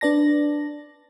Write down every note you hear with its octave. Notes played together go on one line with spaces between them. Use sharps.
D4 B4 D5 A5 A#6